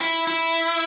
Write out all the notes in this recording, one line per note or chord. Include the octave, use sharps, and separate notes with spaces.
E4
E4